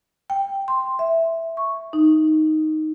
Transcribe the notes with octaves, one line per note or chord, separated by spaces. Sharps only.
G5
C6
E5
C#6
D#4